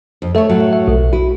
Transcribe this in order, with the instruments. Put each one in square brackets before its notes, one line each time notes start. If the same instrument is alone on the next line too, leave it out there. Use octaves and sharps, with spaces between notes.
[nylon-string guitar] F2
[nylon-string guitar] A3 C#5 [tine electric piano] A4 E5
[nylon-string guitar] A2 F#3
[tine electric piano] E5
B1
[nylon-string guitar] E4 [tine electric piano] F#4